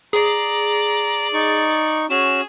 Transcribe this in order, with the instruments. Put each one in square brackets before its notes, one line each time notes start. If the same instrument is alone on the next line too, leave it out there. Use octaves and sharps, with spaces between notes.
[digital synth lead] G#4 [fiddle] D5 [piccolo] A#5
[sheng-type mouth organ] D#4 C#6 [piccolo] A6
[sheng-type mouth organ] C#4 F#4 [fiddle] G#4 [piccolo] E7